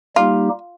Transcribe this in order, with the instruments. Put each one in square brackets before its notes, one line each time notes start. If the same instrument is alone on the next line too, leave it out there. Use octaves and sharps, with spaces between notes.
[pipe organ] G3 A#3 D#4 G4 [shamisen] F4